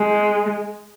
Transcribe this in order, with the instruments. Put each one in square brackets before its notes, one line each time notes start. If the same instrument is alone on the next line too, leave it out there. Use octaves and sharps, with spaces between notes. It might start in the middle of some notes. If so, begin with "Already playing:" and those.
Already playing: [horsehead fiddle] G#3